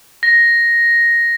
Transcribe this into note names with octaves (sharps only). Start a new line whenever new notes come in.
A#6